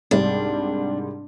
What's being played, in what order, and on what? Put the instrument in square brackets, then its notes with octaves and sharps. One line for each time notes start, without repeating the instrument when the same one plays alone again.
[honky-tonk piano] C2 G#2 G3 [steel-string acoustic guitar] D4